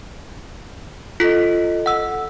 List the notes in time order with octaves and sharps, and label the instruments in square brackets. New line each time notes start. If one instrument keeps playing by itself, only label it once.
[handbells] F4 B6 [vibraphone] A4 D#5
[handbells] F#5 E6